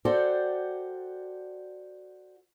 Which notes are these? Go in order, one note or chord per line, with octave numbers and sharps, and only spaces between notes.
F#4 A4 C5 D5 F#5 G5